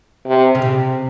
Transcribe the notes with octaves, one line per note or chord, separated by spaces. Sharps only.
C3
C#3
C3